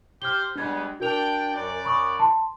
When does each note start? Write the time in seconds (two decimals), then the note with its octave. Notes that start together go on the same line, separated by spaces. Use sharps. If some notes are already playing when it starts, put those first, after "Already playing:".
0.22 G4 C5 F6 G7
0.55 G3 G#3 B3 D4 G#6
1.00 D4 F#4 A#4 G5 F7
1.54 F#2 D5
1.85 B5 C#6 D#6
2.19 A5 C6